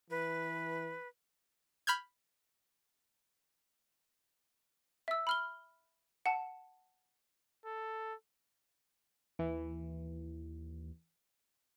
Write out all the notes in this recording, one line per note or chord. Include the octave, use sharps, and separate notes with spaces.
E3 B4
B5 F6 G6 G#6
E5 E6
B5 F6 G7
F#5 A5
A4
D#2 E3